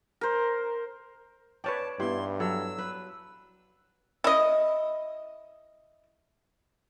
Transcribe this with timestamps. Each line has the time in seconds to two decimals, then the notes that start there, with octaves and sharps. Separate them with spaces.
0.21 A#4 C5
1.64 B4 C#5 D5 G5 A5
2.00 G2 B3 E4 G4 C6
2.40 F#3 A4 E6
2.78 B4
4.24 E4 D#5